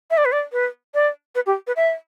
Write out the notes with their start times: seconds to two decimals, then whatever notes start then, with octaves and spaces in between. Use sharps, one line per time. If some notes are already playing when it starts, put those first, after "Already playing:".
0.11 E5
0.17 D5
0.25 B4
0.32 D5
0.52 B4
0.94 D5
1.35 B4
1.46 G4
1.67 B4
1.76 E5